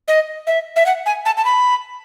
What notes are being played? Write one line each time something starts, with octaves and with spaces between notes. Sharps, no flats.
D#5
E5
E5
F#5
G#5
A5
A5
B5